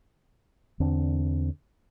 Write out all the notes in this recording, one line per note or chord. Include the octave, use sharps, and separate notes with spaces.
E2 D3 C4 D4